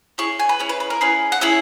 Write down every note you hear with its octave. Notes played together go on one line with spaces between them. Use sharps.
C#4 E4 G#4 C#6
G#5
B4
C#4 E4 G#4
B4
B4
A#4
C#4 E4 G#4 B4
F#5
C#4 E4 G#4 E5